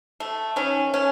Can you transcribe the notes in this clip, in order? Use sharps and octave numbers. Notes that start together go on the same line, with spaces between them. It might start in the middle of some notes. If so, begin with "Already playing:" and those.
A3
D#3 C#4
A3 C#4